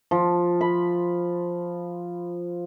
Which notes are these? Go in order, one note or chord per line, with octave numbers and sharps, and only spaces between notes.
F3
B5